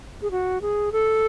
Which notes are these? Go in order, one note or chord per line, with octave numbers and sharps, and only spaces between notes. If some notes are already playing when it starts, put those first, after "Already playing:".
G#4
F#4
G#4
A4